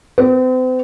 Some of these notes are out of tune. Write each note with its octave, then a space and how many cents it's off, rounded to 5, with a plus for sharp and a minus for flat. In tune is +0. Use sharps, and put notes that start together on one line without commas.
C4 -40